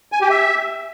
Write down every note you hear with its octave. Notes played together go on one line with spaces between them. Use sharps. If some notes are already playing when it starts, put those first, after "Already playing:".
G#5
G4
E5